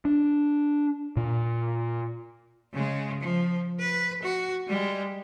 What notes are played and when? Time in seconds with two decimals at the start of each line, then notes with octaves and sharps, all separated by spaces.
0.05 D4
1.17 A#2
2.73 C#3 G#3
3.20 F3
3.79 B4
4.22 F#4
4.67 G3 G#3